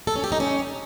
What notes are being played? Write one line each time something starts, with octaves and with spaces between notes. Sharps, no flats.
A4
C#4
G4
D#4
C#4